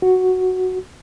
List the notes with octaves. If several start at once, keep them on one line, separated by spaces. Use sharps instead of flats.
F#4